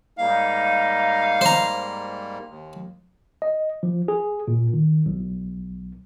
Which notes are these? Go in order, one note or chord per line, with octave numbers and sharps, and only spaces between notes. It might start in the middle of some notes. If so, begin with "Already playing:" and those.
G#2 G3 A#3 D#4 F5
C5 A#5
D#2
D#5
F3
G#4
A#2
D#3
B1